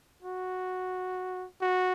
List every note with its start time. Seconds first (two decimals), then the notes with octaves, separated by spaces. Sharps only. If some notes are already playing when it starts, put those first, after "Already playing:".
0.23 F#4
1.62 F#4